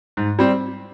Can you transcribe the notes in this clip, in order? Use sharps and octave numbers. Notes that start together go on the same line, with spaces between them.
G#2
G3 C4